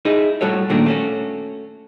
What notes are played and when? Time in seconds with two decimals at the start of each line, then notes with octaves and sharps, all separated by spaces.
0.05 D#4 E4 G#4 D#5
0.41 A2 G3 F#4 A4 C#5
0.70 A#2 D#3 A3 A#3 D4 F#4
0.86 A3 C#4 F#4